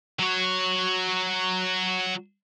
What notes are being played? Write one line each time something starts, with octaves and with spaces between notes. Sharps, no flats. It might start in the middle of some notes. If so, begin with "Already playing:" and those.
F#3 C#5